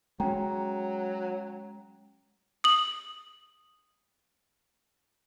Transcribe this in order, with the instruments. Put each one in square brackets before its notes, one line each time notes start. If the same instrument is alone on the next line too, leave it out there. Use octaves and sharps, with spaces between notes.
[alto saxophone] F#3 [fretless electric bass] G#3 C#4 [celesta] G5 A#5
[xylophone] D#6 F#7